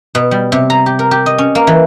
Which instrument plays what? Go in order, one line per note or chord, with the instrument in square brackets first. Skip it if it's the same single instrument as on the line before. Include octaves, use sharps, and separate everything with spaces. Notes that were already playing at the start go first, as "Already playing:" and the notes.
[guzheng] B2
G3
C3
A#5
G4
A#4
G4
D#5
C#4
A#3
E3